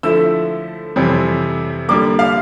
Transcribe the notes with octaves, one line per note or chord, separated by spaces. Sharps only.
D3 F3 A3 E4 E6
F2 C3 E3 G3 C4
D3 G3 A#3 D6
F5